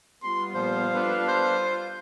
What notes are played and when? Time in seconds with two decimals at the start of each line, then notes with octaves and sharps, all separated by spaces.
0.23 G3 B3 F4 C6
0.54 A#2 F3 C5 F5
0.95 D4 A4 B4
1.28 C5
1.61 F4